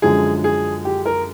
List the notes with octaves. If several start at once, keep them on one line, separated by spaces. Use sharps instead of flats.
F#2 D3 F3 G#3 G#4
G#4
G4
A#4